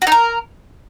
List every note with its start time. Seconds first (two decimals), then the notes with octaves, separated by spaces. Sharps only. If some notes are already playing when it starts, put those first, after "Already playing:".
0.02 F#4
0.07 D#4
0.12 A#4